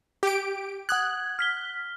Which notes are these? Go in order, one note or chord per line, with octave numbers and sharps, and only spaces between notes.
G4 D7
F#5 D#6 F#6 G#6
F6 B6 G7